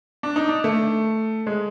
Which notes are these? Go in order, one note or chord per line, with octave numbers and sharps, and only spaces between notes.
D4
D#4
D4
A3
G#3